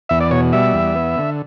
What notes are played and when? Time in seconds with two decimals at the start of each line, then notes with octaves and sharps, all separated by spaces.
0.09 E2 E5
0.20 D5
0.31 B2 C#5
0.53 G3 E5
0.74 E2
0.95 B3
1.18 D3